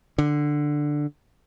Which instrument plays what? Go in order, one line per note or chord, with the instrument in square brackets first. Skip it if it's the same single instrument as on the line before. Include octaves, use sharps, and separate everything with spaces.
[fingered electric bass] D3